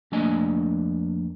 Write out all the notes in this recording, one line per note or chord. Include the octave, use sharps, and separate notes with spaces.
F2 A3 A#3 D4 D#5 G#5